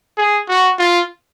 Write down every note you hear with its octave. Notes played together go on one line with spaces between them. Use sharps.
G#4
F#4
F4